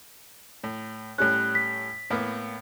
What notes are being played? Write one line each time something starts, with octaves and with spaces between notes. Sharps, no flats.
A2
A2 G3 C#4 F#6
B6
A2 A#3 B3